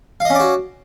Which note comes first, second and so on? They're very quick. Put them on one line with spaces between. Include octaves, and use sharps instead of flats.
F5 D#5 C#4 D5 F#4